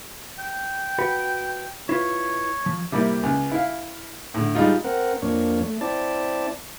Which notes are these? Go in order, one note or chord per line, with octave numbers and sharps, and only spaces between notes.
G5
F#4 B4 B5
E4 F4 B4 C#5
F3
C3 G3 A#3 E4
C#2
E4 F5
A2 D3
G3 G#3 D#4 F4
C4 A#4 F#5
F2 A#3 D4 C#5
A3
C4 E4 D5 A5